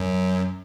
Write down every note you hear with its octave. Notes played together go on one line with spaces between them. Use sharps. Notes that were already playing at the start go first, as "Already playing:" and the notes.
Already playing: F#2